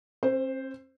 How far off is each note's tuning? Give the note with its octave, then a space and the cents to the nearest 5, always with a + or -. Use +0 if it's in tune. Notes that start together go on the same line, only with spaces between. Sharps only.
C4 +40 C5 +0